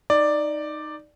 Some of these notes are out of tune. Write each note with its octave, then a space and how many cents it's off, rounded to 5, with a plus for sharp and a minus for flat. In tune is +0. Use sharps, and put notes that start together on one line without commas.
D#4 -5 D5 +5